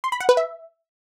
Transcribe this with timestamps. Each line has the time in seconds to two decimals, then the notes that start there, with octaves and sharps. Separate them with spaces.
0.04 C6
0.12 B5
0.20 F#5
0.29 B4
0.37 E5